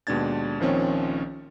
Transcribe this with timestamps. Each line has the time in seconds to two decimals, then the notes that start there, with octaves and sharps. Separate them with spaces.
0.07 D#2 B2 G#3 D4 G#6 A6
0.60 A#1 D#3 F3 C4 C#4 C#5